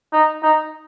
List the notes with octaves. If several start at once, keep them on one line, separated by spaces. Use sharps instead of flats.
D#4
D#4